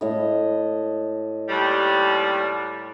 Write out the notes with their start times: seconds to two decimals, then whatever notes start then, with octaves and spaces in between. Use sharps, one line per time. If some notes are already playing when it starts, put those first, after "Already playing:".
0.01 A2 D#5
1.49 D#2 G3